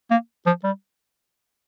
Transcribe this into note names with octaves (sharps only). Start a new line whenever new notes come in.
A#3
F3
G3